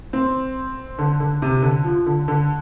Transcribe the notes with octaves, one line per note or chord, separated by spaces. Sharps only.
C4
D3
D3
C3
D3
F3
D3
D3